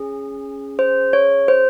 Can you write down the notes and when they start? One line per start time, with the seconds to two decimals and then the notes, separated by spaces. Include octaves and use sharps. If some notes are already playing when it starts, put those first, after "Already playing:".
Already playing: C#4 G#4
0.79 C5
1.13 C#5
1.48 C5